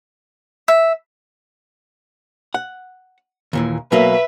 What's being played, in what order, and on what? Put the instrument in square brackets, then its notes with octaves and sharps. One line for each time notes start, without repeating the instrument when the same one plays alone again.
[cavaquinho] E5
[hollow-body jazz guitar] F#5
D#2 A#2 E3
[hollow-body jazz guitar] B2 F#3 A#3 [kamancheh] B4 E5